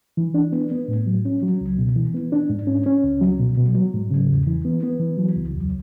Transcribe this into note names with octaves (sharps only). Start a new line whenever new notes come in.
E3
D4
B3
B3
A2
F#3
C#4
F#3
C#2
B2
E3
B3
D4
G#2
C#4
C#4
C#2
F#3
B2
B2
F#3
G#2
C#3
E2
E3
B3
B3
E3
F#3
C#2
E2